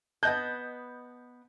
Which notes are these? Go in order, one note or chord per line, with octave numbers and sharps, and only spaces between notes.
B3 D#5 A5 F#6 G6